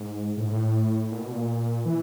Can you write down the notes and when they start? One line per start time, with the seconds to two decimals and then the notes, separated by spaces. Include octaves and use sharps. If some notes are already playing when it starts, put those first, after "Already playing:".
Already playing: G#2
0.37 A2
0.45 G#2
0.51 A2
1.12 A#2
1.22 B2
1.32 A#2
1.86 E3